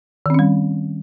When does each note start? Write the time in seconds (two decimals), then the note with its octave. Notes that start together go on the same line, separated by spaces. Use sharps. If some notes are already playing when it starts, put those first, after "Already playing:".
0.26 D#3
0.30 C4
0.34 C#4
0.39 G3